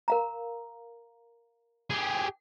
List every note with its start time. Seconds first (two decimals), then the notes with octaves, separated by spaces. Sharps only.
0.08 A#4 F5 A#5
1.90 G4 G#4